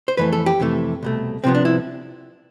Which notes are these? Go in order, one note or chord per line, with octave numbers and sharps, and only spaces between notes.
C5
F2 E3 A3 B4
A4
G4
F2 C3 E3 A3
C2 B2 A3
C2 C3 F3 B3 C4
D4
E4